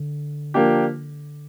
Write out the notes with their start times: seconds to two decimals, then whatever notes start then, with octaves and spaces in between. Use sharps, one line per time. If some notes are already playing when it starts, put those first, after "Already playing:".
Already playing: D3
0.54 F3 A#3 D4 G4